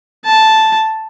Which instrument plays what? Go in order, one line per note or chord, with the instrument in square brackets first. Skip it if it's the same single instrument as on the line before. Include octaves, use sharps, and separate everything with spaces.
[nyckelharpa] A5